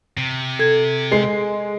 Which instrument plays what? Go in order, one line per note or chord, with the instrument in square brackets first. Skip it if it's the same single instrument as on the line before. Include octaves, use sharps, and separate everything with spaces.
[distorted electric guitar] C3
[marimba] A4 G#6
[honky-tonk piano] G#3 C7